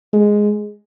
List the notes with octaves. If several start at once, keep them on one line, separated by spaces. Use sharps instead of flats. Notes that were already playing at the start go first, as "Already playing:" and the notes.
G#3